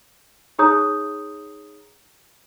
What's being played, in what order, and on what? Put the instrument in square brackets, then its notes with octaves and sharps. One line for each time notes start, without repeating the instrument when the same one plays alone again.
[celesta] D#4 G#4 C#5 A#5 D#6 G6